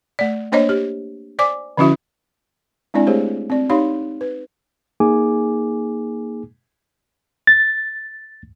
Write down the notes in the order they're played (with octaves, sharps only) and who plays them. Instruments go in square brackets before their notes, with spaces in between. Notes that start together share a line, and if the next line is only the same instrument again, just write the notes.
[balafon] A3 D5
A#3 D4 C5 C#5 D#5
G4
C5 D5 G#5 D6
D3 F3 C#4 E4 F#4 E5
G#3 C4 D4 E4 D5 G#5
A3 G4 G#4 C5 C#5
C4 D5
D#4 G4 C#5 F5 B5 C6
B4
[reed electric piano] A#3 D#4 G#4 G#5 D6
[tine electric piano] A6